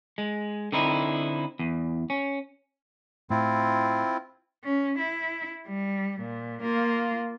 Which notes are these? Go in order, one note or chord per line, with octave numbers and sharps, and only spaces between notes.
G#3
D3 C4 D#4 E4
E2
C#4
A2 C4 E4 F4
C#4
E4
G3
A#2
A#3 F4